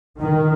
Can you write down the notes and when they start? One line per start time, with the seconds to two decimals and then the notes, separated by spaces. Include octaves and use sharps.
0.20 D#3